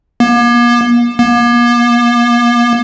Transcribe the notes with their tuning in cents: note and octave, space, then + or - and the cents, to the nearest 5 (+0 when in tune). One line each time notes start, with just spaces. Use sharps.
A#3 +45
A#3 +45